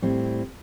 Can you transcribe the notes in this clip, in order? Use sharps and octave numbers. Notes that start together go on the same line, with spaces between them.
A2 G3 C4 E4